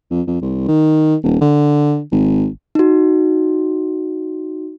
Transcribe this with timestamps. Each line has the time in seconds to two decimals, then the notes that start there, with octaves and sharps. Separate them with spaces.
0.11 F2
0.28 F2
0.42 C2
0.68 D#3
1.23 D#1
1.41 D3
2.12 G#1
2.75 D#4 F#4